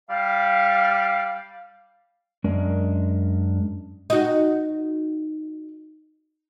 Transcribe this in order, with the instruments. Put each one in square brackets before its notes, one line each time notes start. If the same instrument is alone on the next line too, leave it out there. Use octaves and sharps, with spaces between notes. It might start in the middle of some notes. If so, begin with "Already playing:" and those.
[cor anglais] G3 [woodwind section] F5
[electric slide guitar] F#2 G#3 C#4 D4 A#4
[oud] D#4 F#4